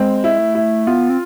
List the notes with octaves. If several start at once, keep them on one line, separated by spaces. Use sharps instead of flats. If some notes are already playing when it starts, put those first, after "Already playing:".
Already playing: G#3 C4
E4
A3
E4
B3 F4
C4